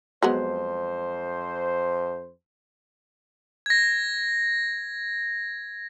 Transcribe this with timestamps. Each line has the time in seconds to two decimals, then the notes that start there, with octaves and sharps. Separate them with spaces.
0.23 F2 F#3 G#3 B3 C5
3.66 G#6 A#6